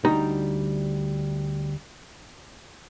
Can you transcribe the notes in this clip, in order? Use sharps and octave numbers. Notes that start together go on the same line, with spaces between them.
D2 G3 D#4 A#5